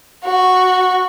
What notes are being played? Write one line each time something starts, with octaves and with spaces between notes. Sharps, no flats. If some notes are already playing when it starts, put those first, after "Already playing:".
F#4